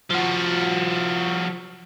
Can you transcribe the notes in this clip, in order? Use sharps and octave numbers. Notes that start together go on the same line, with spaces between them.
F3 F#4